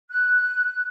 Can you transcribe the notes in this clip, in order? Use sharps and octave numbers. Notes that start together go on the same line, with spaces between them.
F#6